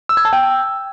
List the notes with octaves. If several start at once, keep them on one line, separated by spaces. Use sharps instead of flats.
E6
G#6
A5
G5